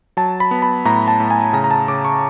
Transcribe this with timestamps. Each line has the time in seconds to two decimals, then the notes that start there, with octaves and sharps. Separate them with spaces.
0.17 F#3 A5
0.40 B5
0.51 B3
0.62 B5
0.85 A2 A#5
1.08 A5
1.20 A2
1.31 G#5
1.53 C#3 A#5
1.64 A#5
1.71 A5
1.88 C#3 D6
2.05 C#6